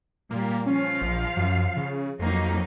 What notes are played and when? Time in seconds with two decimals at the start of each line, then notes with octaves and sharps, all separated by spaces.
0.31 A#2 G3 A#3
0.66 F3 C#4 F5
1.02 A#1
1.37 F#2
1.77 C#3
2.19 F2 F#3 A#3 D#4